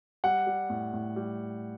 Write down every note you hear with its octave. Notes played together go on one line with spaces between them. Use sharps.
G3 F#5
G3
A2
A2
G3